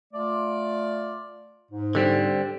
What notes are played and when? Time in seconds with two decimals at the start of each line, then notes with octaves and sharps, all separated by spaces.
0.13 A3 F4 D5
1.72 G#2
1.95 D3 G3 C4